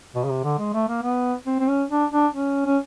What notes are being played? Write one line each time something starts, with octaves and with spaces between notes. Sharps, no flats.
B2
C#3
C3
D3
G#3
A3
A#3
B3
C4
C4
C#4
D4
D4
C#4
C#4